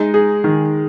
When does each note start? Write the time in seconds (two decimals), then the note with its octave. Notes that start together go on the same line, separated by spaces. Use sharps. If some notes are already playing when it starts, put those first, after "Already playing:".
Already playing: G#3 D#4
0.14 G#4
0.44 D#3